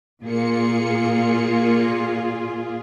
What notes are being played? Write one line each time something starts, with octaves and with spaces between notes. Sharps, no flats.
A#2 A#3 F4 G#4 C#7